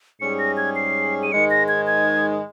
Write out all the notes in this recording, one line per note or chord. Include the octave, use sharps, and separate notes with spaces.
G#2 G3 C#4 G#4 C#7
A#6
G#6
C7
D#7
G#2 D#3 G#3 C#7
A#6
G#6
G#6